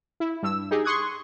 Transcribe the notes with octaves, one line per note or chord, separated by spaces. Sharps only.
E4
G2 E6
D#4 G4 G#4
C6 C#6 D#6 F#6 G#6